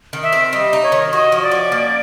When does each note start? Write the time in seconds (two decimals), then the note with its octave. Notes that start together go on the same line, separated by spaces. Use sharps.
0.13 D#3
0.23 E5
0.32 C4
0.53 G3 D#5
0.73 D#4
0.83 C#5
0.92 D#3
1.12 F#4 D#5
1.32 F3
1.42 D5
1.51 C#4
1.72 A#3